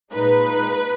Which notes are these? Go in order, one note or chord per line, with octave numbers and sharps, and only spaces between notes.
A#2 G#3 D#4 B4